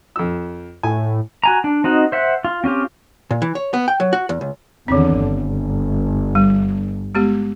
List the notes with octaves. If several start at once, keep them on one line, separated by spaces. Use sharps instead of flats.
F2 E6
A2 G#5
F#4 G#5 A#5
D4
C4 D#4 F#4 D#5
C5 E5 F#5
F4
C4 C#4 F4 G4
A#2
E3
C#5
B3
G5
F#3
F#4
E2
C#2
E2 D3 D#3 C4
G1
G3
G#3 B3 G4